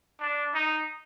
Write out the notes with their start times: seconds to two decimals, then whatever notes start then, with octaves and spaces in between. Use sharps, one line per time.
0.21 D4
0.54 D#4